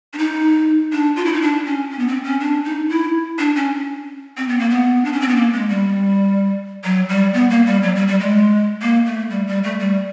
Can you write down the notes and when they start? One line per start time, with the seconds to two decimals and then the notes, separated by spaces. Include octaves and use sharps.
0.13 D4
0.18 D#4
0.92 D4
1.16 F4
1.25 E4
1.34 D#4
1.42 D4
1.66 C#4
1.90 C#4
1.99 B3
2.08 C4
2.24 C#4
2.40 D4
2.65 D#4
2.90 E4
3.39 D4
3.56 C#4
4.37 C4
4.48 B3
4.59 A#3
4.70 B3
5.05 D4
5.13 C#4
5.21 C4
5.28 B3
5.36 A#3
5.53 G#3
5.69 G3
6.84 F#3
7.09 G3
7.34 B3
7.50 A#3
7.66 G3
7.83 F#3
7.95 G3
8.08 G3
8.20 G#3
8.82 A#3
9.06 A3
9.30 G3
9.47 G3
9.64 A3
9.80 G3